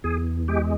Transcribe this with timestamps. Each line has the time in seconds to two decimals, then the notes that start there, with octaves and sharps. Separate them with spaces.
0.04 E2 G#4
0.48 G#3 G4